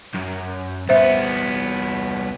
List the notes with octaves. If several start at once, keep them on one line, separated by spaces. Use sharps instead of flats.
F#2
C2 B3 C5 E5